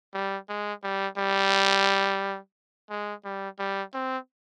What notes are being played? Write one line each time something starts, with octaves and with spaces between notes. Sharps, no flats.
G3
G#3
G3
G3
G#3
G3
G3
C4